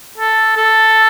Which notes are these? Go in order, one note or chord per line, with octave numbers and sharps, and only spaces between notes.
A4
A4